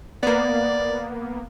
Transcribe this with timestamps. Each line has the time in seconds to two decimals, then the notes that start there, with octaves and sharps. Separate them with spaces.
0.23 A#3 B3 D5